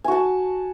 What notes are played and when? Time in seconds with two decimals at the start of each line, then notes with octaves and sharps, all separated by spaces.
0.04 G#5
0.08 F#4
0.12 A5